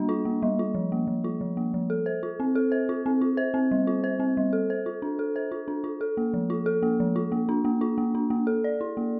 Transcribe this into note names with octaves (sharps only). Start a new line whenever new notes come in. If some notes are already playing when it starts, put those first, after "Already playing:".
Already playing: G3 A#3 D4
F4
A#3
G3
F4
F3
A#3
F3
F4
F3
A#3
F3
A4
C5
F4
C4
A4
C5
F4
C4
F4
C5
C4
G3
F4
C5
C4
G3
A4
C5
F4
D4
A4
C5
F4
D4
F4
A4
A#3
F3
F4
A4
A#3
F3
F4
A#3
D4
A#3
F4
A#3
D4
A#3
A4
D5
E4
A#3